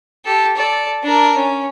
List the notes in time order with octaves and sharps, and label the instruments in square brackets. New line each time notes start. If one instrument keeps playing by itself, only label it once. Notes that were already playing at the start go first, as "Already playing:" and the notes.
[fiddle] G4 A4
A4 D5
D4 A#4
C#4